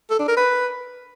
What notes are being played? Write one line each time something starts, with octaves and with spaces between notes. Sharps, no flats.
A4
D4
A#4
B4